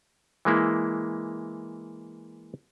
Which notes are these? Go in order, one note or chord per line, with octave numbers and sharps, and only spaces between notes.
E3 G#3 A#3 E4